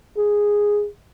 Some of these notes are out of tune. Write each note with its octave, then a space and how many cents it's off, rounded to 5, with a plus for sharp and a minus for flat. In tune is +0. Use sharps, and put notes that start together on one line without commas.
G#4 -5